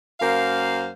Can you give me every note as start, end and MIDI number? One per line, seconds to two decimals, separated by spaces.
0.20 0.90 42
0.20 0.90 58
0.20 0.90 72
0.20 0.90 77